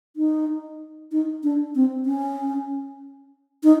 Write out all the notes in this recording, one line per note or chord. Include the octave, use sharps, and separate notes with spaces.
D#4
D#4
D4
C4
C#4
D#4